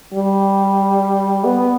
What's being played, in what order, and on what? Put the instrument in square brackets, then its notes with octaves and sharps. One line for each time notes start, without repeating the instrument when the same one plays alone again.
[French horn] G3
B3